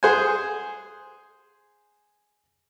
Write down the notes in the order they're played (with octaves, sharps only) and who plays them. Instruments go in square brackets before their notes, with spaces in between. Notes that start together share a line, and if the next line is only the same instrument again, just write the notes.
[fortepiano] G#4 C5 F#5 G#5